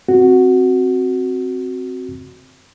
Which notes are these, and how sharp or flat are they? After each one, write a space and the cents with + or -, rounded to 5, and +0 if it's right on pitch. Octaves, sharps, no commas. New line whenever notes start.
C4 +0 F#4 +0